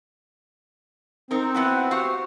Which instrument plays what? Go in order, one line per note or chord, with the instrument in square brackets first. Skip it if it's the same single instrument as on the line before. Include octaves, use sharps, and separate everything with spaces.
[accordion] C4 [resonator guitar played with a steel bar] D#4 A#4
[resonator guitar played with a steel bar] B3 E4 F#4
F#4 G4 F5